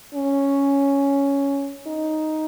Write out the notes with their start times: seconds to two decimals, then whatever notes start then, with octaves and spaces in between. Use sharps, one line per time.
0.14 C#4
1.87 D#4